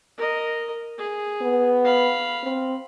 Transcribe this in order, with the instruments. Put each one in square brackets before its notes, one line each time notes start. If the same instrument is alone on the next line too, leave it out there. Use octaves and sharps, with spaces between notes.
[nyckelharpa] A#4 D#5
G#4
[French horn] B3
[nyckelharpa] F5 B5
[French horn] C4